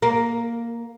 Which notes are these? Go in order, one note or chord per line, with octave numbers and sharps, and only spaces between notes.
A#3